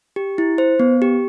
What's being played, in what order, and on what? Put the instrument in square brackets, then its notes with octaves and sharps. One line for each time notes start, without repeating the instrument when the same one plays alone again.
[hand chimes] G4
E4
C5
B3
G4